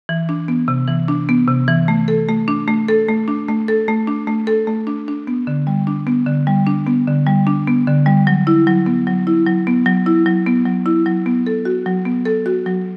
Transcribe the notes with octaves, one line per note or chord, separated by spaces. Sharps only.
E3
D4
B3
C3
E3
D4
B3
C3
E3
A3
A4
A3
D4
A3
A4
A3
D4
A3
A4
A3
D4
A3
A4
A3
D4
D4
B3
D3
G3
D4
B3
D3
G3
D4
B3
D3
G3
D4
B3
D3
G3
F#3
E4
F#3
B3
F#3
E4
F#3
B3
F#3
E4
F#3
B3
F#3
E4
F#3
B3
A4
F#4
F#3
B3
A4
F#4
F#3